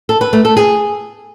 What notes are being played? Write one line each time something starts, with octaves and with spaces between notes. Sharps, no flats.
A4
B4
A3
A4
G#4